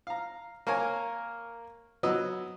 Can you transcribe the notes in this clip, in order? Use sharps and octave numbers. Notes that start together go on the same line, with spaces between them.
F5 A#5
A#3 A#4 C#5 G#5
F#3 B3 D#5 E6